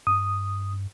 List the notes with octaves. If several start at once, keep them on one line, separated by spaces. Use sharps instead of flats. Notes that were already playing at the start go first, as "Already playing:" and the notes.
G2 D#6